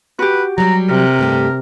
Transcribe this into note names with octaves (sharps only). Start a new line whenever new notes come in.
F#4 G4 B4
F#3 G3 A#5
C3 A#4
G2 A3 G4